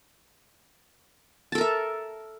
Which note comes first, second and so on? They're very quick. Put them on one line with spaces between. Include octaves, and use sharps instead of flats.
A5 A4 A#4 E5